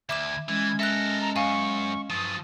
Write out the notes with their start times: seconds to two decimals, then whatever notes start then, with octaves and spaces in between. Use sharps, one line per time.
0.09 D2 E5 D6 G#6 E7
0.49 E3 G#3 C#4 G#6
0.79 A4 A#4 E5 E6 F#6 A#6
1.21 A#5
1.36 F#2 F5 G#5 C#6
2.10 G2 F3 F#3 D#6 A6